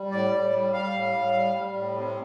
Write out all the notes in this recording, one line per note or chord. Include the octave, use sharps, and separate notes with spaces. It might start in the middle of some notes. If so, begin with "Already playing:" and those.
Already playing: G3
A2 D5
A2
G3
G3 F5
A2
A2
G3
G3
A2
C3